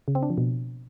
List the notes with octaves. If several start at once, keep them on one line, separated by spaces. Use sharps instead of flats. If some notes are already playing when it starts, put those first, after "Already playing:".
C#3
C4
D4
F3
B2